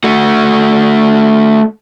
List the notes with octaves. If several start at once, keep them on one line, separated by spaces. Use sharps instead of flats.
A3 F#4